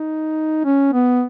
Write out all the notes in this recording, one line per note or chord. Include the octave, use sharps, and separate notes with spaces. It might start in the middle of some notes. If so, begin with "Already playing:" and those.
Already playing: D#4
C#4
B3